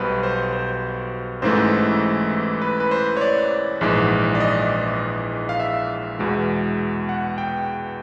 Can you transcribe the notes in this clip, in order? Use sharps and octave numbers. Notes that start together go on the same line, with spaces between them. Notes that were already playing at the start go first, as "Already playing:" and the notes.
Already playing: B1 B2 G3 B4 C5
C5
C5
A1 G#2 E3 A3 C5
B4
B4
C5
C#5
D5
A#1 G#2 E3 G#3
D5
D#5
F5
E5
E2 B2 G#3
F#5
G5